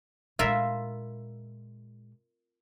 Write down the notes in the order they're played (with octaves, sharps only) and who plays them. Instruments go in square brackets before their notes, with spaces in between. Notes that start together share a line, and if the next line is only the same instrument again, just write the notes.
[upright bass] A#2 G#3 [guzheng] F4 A#4 [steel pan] E5